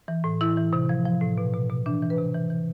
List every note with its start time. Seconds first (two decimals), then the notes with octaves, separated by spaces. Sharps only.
0.08 E3
0.24 A2
0.41 E3 E4
0.57 E3
0.73 C3
0.89 F3
1.05 F3
1.21 A2
1.38 B2
1.54 B2
1.70 B2
1.86 E3 D4
2.02 E3
2.10 B4
2.18 C3
2.35 E3
2.50 E3